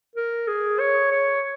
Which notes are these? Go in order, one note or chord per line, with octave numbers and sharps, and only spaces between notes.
A#4
G#4
C#5
C#5